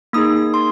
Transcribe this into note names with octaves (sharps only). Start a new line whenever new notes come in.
A#3 D#4 G#4 D#6
C6